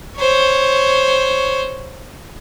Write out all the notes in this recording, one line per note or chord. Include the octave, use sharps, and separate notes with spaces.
C5 C#5